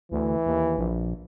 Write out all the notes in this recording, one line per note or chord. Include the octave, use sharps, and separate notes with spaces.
D2 E3
D#2
A#1